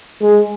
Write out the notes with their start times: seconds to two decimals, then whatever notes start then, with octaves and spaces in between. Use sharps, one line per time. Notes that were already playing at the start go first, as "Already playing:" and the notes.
0.22 G#3